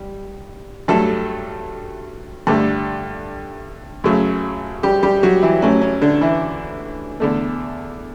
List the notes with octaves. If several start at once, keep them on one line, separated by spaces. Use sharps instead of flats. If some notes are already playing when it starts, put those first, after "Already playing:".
Already playing: G3
G2 F#3 A3 A4
G2 D3 A3
F#2 C#3 F#3 A3
G3 G4
G3 G4
F#3 F#4
E3 E4
A1 A2 F#3 A3 C#4
C#4
D3 D4
E3 E4
E2 D3 A3